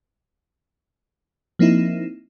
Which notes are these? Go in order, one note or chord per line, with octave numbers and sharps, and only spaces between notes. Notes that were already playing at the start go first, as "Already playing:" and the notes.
F3 A#3 C4 D#4 E4